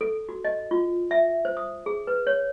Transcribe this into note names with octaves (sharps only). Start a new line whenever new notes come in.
A4
F#4
D#5
F4
E5
C5
D#6
G#4
B4
C#5